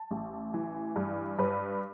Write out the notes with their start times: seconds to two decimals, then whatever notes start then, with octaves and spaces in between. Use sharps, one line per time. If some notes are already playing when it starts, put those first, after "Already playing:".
Already playing: A5
0.11 A1
0.54 E3
0.96 G2
1.39 G2 B4